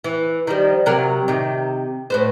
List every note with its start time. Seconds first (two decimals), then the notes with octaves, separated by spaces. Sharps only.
0.04 E3
0.47 D#3 F3 G3
0.86 C3 F#3 A#4
1.28 C3 D#3
2.10 A2 B4 C5